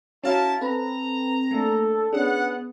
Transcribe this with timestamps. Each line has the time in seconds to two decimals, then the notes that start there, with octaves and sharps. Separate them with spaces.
0.24 C#4 E4 F#4 A#4 F5 A5
0.61 C4 A4 B4 A#5
1.51 A3 A#3 D4 A4
2.13 B3 C#4 D4 G#4 F#5